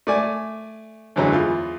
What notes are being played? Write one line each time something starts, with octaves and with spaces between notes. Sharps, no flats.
A3 D5 G#5
F#2 D3 E3 F#3 G#3
E2 F4